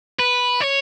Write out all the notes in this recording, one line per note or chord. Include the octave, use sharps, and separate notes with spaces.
B4
C#5